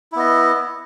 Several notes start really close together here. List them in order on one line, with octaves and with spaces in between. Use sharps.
E4 B3 D#5